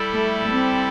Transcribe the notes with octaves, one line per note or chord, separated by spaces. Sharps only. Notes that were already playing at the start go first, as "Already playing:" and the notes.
Already playing: G3 E4 A4 D5
A3
C4